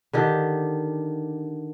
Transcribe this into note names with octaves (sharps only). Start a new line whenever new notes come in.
D3 D#3 G4